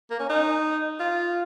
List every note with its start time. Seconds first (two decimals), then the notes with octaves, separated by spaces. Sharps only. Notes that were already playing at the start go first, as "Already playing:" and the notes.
0.11 A#3
0.20 C#4
0.30 D#4
0.99 F4